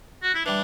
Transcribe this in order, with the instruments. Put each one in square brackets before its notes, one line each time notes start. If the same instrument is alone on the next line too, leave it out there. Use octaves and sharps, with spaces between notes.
[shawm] F#4
E4
[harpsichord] E3 G3 [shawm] D4